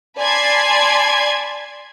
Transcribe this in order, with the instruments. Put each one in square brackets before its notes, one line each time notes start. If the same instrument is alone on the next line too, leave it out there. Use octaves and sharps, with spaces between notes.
[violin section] D5 G#5 A5 B5 C6 G#6